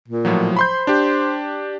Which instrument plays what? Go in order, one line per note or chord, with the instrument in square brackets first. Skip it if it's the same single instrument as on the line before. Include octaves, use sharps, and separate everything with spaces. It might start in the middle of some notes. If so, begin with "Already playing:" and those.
[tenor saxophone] A#2
[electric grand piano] A2 F3 F#3
[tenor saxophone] C5 [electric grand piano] B5 C6 G6
[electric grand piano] D4 G4